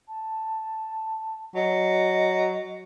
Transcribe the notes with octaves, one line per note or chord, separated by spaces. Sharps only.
A5
F#3 D#5